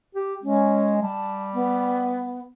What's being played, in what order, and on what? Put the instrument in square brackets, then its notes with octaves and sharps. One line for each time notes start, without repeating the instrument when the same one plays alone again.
[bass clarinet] G4
[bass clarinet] G#3 [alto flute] C#4
[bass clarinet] G3 [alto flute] A5
[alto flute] B3